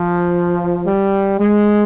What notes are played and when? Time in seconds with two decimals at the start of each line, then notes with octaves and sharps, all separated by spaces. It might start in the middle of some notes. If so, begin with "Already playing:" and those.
Already playing: F3
0.86 G3
1.40 G#3